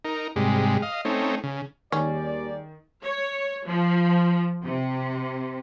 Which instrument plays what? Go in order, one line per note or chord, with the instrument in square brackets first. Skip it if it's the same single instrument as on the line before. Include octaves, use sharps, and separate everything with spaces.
[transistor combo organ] D#4 A#4
G#2 C3 G3 G#3
D#5 F5
A3 C4 C#4 D#4
C#3
[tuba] D#2 [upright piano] D#3 [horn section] G3 G#4 D5 [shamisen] C#4
[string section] C#5
F3
C3